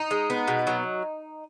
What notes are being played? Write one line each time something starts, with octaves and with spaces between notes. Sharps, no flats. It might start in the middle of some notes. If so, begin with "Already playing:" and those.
Already playing: D#4
G#3
B3
B2
F#3